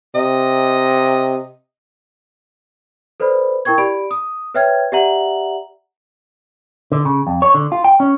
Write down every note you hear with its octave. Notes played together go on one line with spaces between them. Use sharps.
C3 D#5
A4 B4 C5 D5 B5
E4 A#4 G5 C#6 G#6
G4 D5 B5 D7
D#6
B4 C#5 E5 G5 F6 G#6
G4 D5 E5 F#5 A#5 F#7
D3
C#3
F2
C#5
D3
F4
G5
C#4